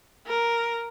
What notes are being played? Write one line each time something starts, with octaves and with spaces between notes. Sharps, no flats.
A#4